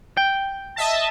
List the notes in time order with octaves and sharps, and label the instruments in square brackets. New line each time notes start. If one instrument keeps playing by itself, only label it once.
[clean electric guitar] G5
[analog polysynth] D#5 E5 A5